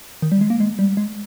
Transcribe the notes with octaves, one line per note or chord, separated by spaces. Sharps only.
D#3
G3
G#3
A#3
G#3
G3
G#3